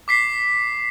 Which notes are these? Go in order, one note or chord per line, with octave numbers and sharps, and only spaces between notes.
D6 B6 C7